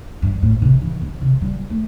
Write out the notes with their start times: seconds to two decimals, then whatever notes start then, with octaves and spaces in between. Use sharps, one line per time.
0.22 G2
0.42 A2
0.62 C3
0.82 E3
1.01 D3
1.21 C3
1.41 G3
1.70 A3